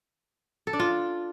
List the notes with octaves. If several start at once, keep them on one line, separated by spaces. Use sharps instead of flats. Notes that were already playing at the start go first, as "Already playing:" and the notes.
A4
D4
F4